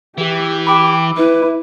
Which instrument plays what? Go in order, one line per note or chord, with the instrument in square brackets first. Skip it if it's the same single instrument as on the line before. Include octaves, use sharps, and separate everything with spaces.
[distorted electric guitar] E3 [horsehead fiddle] G4
[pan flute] G5 [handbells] B5 D6
[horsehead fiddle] E4 [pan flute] B4